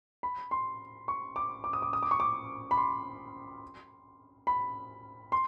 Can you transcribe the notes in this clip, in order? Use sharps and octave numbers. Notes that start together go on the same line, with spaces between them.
B5
C6
C#6
D6
D6
D#6
D6
D#6
D6
C#6
D6
B5
C6
B5
C6